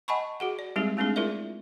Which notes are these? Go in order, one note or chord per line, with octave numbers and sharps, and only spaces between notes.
D#5 F#5 G#5 A5 B5 C#6
F#4 G#4 F#5
D5
G3 G#3 C4 D#4 G4 G#4
G#3 A3 C4 D4 D#4 G#4
E4 F4 G#4 A#4 D5 E5